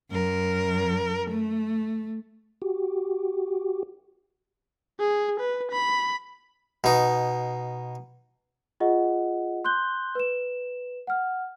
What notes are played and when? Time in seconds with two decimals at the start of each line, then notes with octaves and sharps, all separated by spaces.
0.11 F#2 A#4
1.30 A3
2.62 F#4 G4
5.00 G#4
5.40 B4
5.72 B5
6.84 B2 D#4
8.80 F4 G#4 D#5 F#5
9.65 C6 F#6 G6 G7
10.15 B4 E7
11.07 F#5 F6